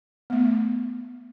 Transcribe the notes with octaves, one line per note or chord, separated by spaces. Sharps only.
A3 B3